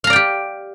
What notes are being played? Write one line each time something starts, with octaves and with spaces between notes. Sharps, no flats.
G4 D5 F5 G5 A#5